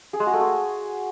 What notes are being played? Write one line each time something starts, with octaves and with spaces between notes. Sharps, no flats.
G#4
G#3
F#4
A3
G#4